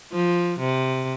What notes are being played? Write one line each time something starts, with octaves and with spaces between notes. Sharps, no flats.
F3
C3